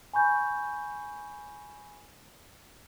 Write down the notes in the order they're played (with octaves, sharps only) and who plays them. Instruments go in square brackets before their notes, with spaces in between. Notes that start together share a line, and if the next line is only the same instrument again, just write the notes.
[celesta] G#5 B5 C#6 G6